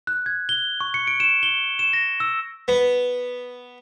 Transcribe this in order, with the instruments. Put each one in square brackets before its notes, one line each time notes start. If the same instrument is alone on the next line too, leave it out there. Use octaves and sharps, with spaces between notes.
[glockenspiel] F#6
G#6
G7
C#6
C#7
D7
E7
G7
E7
A#6
E6
[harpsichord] B3